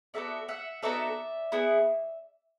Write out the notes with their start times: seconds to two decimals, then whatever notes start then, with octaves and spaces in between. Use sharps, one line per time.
0.14 B3 D#4 F#4 A4 D5 E5
0.48 E5 F#5
0.82 B3 D#4 F#4 A4 D5 E5
1.52 B3 E4 G#4